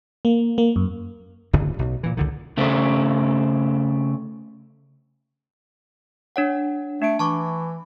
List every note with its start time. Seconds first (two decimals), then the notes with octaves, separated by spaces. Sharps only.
0.25 A#3
0.58 A#3
0.76 F#2
1.53 D1 G1 D2 C#3
1.79 B1
2.03 A#2 E3
2.17 C#2 D3 D#3
2.57 C#3 A3 C4
6.36 D4 C#5 F#5
7.02 A3 D4 C#7 D7
7.19 E3 A5 C#6 D6